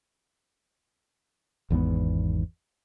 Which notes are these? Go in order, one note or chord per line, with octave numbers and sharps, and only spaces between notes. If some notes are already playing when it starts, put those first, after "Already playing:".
G#1 E2 G#2 B3